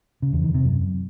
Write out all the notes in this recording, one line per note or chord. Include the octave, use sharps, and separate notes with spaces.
C#3
E2
D#3
C3
F#2